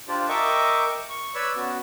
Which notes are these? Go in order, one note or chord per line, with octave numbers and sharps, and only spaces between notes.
D4 F4 G4 C5 D5
A#4 D#5 E5 G5 C#6 D6
C#6
B4 C#5 D5 B5 E6
B3 C#4 F#4